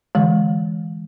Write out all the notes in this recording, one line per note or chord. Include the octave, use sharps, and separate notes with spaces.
D3 E3 G#3